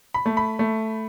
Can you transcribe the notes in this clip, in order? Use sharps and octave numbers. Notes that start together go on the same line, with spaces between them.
B5
A3
B5
A3